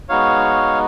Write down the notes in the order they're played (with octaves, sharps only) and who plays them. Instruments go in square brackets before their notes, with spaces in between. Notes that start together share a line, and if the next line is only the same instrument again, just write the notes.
[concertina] G#3 B3 D#4 F#4 C#5 F5